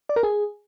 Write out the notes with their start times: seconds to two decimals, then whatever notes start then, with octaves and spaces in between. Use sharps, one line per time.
0.09 D5
0.16 A#4
0.23 G#4